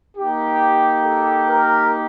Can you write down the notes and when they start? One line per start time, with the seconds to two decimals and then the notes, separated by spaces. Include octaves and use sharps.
0.16 A#3 D#4 G4
1.05 A4
1.49 A#4